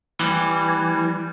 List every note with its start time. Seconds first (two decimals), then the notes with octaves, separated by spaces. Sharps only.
0.20 E3 G3